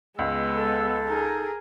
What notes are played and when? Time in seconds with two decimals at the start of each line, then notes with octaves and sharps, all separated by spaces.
0.19 C#2 G#3 B3 E6
0.55 A4
1.09 D#4 G#4 A#4